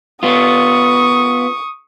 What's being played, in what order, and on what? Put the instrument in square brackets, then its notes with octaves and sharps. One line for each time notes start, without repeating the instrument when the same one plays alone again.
[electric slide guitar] B3 F4 [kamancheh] C#6 D#6